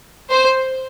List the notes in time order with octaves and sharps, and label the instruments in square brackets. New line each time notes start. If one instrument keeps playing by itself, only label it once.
[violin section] C5